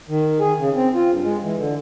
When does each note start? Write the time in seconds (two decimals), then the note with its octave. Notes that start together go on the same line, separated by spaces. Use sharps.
0.09 D#3
0.40 G#4
0.58 C#3
0.75 C4
0.95 F4
1.11 G2
1.23 G#3
1.43 E3
1.57 D3